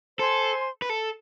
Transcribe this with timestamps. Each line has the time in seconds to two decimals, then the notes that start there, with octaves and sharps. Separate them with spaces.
0.19 A4 C5 G#5 C6
0.82 B4
0.90 A4